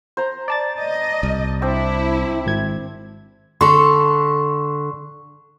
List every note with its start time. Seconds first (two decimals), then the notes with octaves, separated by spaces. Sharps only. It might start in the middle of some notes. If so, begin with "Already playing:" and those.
0.17 C5 A#5
0.48 D5 A5 A6
0.80 D#5
1.23 C2
1.62 C4 D4 E4 C5
2.46 G#1 G#6
3.61 D3 A4 C6 C#6